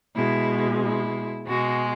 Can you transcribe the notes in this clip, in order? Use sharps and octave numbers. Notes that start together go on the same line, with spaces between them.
B2 G#3 E4
E4
B2 G#3 F#4